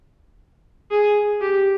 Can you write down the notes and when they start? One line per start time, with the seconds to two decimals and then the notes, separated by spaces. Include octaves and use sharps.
0.91 G#4
1.41 G4